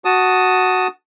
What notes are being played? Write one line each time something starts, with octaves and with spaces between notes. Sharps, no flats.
F#4 A5 D#6